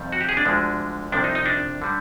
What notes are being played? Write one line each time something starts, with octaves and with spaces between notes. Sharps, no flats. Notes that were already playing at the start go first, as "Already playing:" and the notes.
Already playing: F2 C3 D#3 G3
F#4
G4
G#4
D4
D2 D3 F3 G#3
C2 C3 F3 D4
D#4
D#4
D4
D3 G3